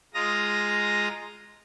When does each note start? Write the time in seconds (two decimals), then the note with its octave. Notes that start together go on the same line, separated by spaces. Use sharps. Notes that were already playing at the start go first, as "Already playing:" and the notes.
0.14 G#3 F4 A#5 D#6 A#6